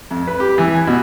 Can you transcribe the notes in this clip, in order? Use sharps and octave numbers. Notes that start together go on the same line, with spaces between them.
F2
B4
G4
E3
G#5
B2